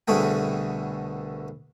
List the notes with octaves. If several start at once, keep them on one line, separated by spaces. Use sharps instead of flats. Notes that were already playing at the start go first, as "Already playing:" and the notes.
C2 B2 D3 A3 G#4 G5